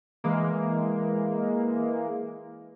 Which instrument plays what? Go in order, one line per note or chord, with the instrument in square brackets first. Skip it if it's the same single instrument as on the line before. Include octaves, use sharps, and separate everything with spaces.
[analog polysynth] E3 G#3 A#3